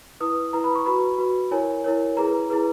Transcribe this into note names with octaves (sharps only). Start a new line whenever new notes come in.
E4 B4 D#6
E4 B4 A#5
B5
C#6
F#4 B4 B5
F#4 B4
E4 A#4 C#5 G#5
E4 A#4 C#5
E4 G#4 B4 A#5
E4 G#4 B4